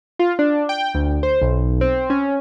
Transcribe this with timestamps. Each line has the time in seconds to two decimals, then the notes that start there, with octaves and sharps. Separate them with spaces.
0.19 F4
0.39 D4
0.69 G5
0.95 D2
1.23 C5
1.42 B1
1.81 C4
2.10 C#4